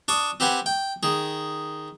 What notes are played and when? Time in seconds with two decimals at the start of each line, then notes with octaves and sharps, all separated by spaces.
0.08 D4 C#6 D#6
0.40 C4 G4 B4 F#5 G#5
0.66 G5
1.03 D#3 G#4